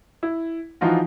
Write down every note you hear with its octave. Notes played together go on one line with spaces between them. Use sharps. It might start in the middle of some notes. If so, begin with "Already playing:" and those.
E4
E3 F3 D#4 F4 F#4